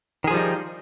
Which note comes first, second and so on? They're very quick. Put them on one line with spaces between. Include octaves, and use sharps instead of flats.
D#3 G#4 F3 G3 D#4